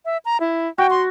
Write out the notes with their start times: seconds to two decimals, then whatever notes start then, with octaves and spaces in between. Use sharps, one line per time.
0.05 E5
0.25 A#5
0.40 E4
0.78 F#4 G5
0.90 C6